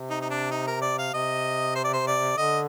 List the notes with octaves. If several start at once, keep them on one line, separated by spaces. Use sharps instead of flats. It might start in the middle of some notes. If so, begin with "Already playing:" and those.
Already playing: C3
D#4
D#4
D4
D#4
A#4
D5
F5
C3 D#5
C5
D5
C5
D5
D3 D#5